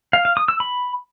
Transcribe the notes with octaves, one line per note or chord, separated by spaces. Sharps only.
F5
F5
D#6
E6
B5